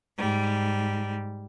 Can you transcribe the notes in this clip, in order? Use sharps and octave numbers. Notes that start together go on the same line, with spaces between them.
G#2 G3